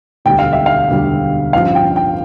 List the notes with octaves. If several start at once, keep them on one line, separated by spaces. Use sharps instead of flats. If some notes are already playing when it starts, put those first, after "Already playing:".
E1 D2 D3 G3 G5
F5
E5
F5
E1 D2 D3 G3
A1 G2 F3 F5
G5
G5